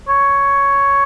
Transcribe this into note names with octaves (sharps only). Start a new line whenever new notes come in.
C#5